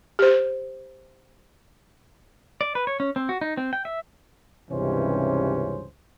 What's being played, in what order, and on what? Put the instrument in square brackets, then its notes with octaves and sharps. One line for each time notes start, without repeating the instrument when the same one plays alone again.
[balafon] G4 C5
[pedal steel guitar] D5
B4
C#5
C#4
C4
F#4
D#4
C4
G5
E5
[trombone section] C#2 G2 C3 E3 C#4 C5